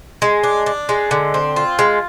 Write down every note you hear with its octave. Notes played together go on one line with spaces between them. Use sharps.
G#3
D4
D4
G#3
D3
C4
F4
G#3